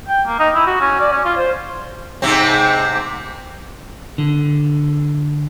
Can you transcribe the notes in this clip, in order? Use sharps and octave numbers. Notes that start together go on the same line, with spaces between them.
G5
A#3
D#4
E4
F#4
C#4
D5
C#4
F4
C5
G#2 C3 C4
D3